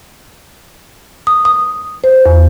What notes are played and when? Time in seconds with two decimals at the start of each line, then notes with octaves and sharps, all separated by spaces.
1.27 D#6
1.45 D#6
2.04 C5
2.26 E2